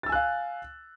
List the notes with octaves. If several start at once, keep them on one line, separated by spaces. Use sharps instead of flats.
F5 G#5 E6 F#6 A6